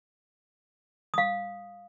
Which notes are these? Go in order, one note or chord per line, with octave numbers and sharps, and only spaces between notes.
F5 D#6